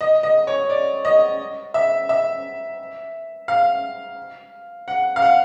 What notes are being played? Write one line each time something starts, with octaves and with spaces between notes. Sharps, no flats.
D#5
D#5
C#5
D5
D#5
E5
E5
F5
F#5
F5
F#5